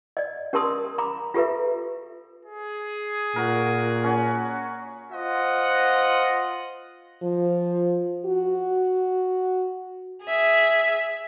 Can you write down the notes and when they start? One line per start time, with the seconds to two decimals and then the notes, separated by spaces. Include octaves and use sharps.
0.17 D5 D#5
0.53 C#4 G4 A#4 A5 C6 D#6
0.98 A#5 B5 D6
1.34 F4 G4 A4 B4 E5
2.45 G#4
3.36 A#2 F#4 A#4
4.04 C#4 F#4
5.12 F4 C5 D#5 F#5
7.23 F3
8.26 F#4
10.24 G#4 E5